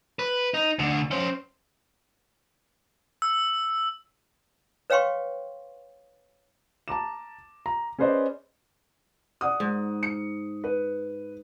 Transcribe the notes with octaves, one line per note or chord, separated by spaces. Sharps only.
B4
D#4
D2 D3
C#4 C5
E6
B4 C#5 F5 G5 C6 C#6
A5 A#5 D6 E7
A#5
C#4 G#4 B4 C5 D5 D#5
D5 F#5 D#6
G#2
C#7
B4